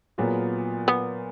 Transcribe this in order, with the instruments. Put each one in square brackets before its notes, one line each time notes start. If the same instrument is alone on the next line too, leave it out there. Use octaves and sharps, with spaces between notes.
[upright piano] A#2 F#3 B3 F4 G#4
[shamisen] B3